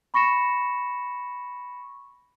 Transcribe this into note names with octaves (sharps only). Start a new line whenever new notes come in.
B5 C#6 A#6 C#7 E7